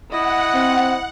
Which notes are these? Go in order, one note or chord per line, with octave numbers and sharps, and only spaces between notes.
E4 D#5 F#5
C4